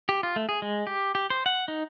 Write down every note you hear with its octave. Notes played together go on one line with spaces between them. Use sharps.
G4
F4
A3
G#4
G#3
G4
G4
C5
F#5
D#4